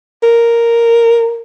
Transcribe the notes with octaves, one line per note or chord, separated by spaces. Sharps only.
A#4